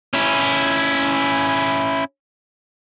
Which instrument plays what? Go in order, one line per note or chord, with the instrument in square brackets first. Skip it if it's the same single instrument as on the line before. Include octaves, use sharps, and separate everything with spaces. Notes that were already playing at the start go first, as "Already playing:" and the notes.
[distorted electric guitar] C#4 E4